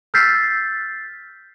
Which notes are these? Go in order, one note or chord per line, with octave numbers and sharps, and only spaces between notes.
E6 F6 G6 A6 B6 C7